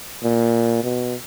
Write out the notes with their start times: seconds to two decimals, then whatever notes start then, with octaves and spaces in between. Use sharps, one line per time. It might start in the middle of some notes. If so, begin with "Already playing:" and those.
0.24 A#2
0.84 B2